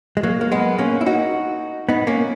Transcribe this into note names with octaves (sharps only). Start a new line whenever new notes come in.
G#3
F#3 A#3
A#3
G#3 B3
A#3 C#4
E4
D#4 F#4
B3 D#4
A#3 C#4